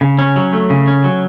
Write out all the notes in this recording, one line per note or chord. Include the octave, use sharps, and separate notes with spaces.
C#3
C#4
F#3
A3
C#3
C#4
F#3